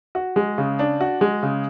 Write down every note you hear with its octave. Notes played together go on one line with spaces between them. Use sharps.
F#4
G#3
C#3
D4
F#4
G#3
C#3